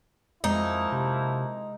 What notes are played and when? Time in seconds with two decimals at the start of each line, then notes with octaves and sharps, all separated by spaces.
0.44 F2 F3 G#3 A#3 D#4 E4
0.92 C3